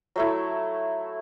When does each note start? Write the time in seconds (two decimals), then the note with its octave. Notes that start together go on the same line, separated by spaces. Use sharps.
0.16 F#3 A3 E4